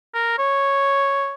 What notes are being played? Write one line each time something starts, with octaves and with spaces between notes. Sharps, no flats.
A#4
C#5